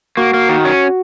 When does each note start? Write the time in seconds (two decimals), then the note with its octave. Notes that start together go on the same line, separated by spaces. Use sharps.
0.17 A#3 F#4
0.34 A#3
0.49 D#3
0.65 C#4